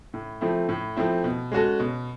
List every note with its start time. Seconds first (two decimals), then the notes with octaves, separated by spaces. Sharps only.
0.14 A2
0.41 F3 A3 C4 E4
0.69 A2
0.97 F3 A3 C4 E4
1.24 B2
1.52 G#3 C#4 F#4 A4
1.80 B2